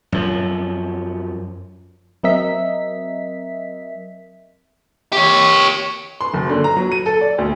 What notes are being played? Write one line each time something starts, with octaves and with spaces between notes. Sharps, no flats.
F#2 F3
F#3 C4 A#4 D#5 E5 B6
G4 C#5
C6
F#1
D3
A#5
F#3
D#7
A4
D5
D2